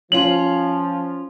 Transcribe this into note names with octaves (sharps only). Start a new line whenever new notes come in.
F3 C#4 F4 F#7